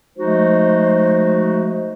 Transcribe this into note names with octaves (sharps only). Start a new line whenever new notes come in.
F3 G#3 A3 D#4 F#4 C5